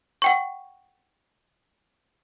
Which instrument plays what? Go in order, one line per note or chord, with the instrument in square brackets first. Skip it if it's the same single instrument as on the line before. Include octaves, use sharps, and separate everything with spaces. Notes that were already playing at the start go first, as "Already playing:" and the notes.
[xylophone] F#5 G5 C#6